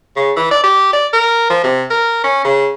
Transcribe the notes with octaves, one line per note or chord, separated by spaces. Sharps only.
C#3
E3
D5
G4
D5
A#4
F3
C3
A#4
C#4
C#3